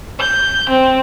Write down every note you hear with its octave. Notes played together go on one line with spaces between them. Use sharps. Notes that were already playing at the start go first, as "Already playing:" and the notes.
G6
C4